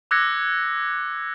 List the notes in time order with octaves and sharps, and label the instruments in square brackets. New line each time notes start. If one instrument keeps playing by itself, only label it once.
[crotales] D6 E6 F#6 G#6 A#6 C#7